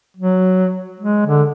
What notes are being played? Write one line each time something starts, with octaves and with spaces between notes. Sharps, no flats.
F#3
G#3
D3